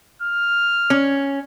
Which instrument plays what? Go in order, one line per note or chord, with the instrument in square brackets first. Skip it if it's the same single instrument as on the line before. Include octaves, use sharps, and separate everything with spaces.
[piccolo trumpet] F6
[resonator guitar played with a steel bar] C#4